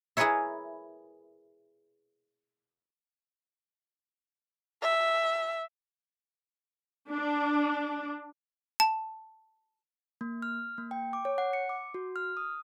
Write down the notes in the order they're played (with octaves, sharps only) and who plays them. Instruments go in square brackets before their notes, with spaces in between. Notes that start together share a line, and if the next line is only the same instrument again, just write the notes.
[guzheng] E4 G#4 A#4 B4 C#5 E5
[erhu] E5
[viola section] D4
[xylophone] A5
[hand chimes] A#3
F6
A#3
G5
D6
C#5
F#5
C#7
D6
F#4
F6
D#6